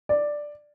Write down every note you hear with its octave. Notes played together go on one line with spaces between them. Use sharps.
D5